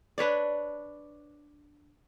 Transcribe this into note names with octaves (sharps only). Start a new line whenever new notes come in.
D4 B4 C#5 D5